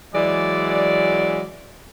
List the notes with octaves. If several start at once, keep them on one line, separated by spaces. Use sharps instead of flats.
E3 F#3 G#3 D5